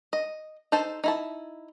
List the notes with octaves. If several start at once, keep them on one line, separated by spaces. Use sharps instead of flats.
D#5
D#4 A4 C5 A5
D#4 E4 A5